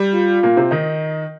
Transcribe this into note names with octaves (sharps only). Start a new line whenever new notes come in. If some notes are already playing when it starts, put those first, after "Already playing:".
Already playing: G3
F4
A#2 A#3
C3 C4
D#3 D#4